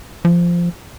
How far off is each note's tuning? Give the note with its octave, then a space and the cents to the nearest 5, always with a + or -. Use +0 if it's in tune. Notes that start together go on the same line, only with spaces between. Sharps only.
F3 -10